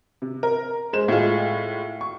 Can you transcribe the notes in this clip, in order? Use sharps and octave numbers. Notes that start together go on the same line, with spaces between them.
C3
A#4
G#3 C5 E7
A2 G#3 F4
C#6